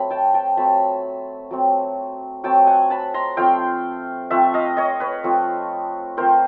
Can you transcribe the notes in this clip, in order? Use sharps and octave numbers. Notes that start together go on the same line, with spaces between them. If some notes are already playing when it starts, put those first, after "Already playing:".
Already playing: F#3 A3 C4 B5
G5 A5
G5 A5
F#3 A3 C4 A5 B5
F#3 A3 C4
F#3 A3 C4 G5 A5
F#5 G#5
A5 B5
A#5 C6
F3 A3 C4 F5 G5
F3 A3 C4 E5 F#5
D#5 F5
C#5 D#5
B4 C#5
F3 A3 C4
F3 A3 C4 A#4 C5